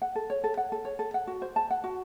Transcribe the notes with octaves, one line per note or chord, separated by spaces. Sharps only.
F#5
A4
C#5
A4
F#5
A4
C#5
A4
F#5
F#4
C5
A5
F#5
F#4